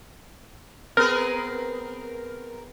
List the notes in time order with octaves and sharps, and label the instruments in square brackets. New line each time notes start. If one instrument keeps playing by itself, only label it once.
[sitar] B3 C4 G#4 [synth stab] A#4